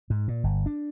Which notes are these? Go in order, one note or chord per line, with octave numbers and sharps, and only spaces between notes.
G#2
A#2
G1
D4